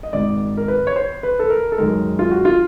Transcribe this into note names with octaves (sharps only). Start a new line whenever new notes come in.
D#5
G#1 G#2 D#3 D5
A#4
B4
C#5
C5
B4
A4
A#4
A4
F#2 D#3 G#3 A#4
F4
F#4
F4